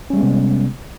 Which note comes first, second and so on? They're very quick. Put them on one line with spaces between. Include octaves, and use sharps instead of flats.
C#4 G3 G#3 B3 C3